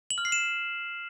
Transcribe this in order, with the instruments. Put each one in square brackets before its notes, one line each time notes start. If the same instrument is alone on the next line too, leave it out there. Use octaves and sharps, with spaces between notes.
[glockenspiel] F#7
F6
C7
E7